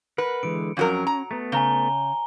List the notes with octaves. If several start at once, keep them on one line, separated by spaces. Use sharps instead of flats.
A#4 B4 F#5
D3 E3 G#3 C#7 D7
F2 F#3 C#4 A#4
A#5
A3 B3
C#3 G#5 A#5 G7